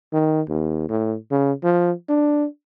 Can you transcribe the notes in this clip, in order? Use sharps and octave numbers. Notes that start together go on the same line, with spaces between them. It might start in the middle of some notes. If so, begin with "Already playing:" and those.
D#3
D#2
A2
C#3
F3
D4